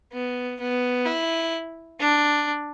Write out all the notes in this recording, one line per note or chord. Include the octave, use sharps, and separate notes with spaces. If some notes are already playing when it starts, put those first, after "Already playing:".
B3
B3
E4
D4